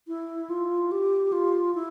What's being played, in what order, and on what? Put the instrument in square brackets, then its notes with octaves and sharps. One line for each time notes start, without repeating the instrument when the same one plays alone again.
[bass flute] E4
F4
G4
F4
E4